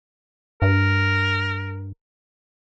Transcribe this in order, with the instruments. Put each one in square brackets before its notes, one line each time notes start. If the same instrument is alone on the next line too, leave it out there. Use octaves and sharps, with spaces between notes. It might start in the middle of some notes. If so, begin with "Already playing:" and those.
[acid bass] G2 [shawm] A#4